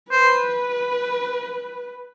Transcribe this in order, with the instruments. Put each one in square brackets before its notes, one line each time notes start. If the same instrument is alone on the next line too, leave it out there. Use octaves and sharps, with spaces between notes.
[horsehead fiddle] B4 [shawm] C5